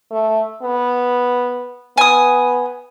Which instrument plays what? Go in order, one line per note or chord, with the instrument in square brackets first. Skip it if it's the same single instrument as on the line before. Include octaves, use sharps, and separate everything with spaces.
[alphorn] A3
B3
[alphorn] B3 [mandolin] G#5 D#6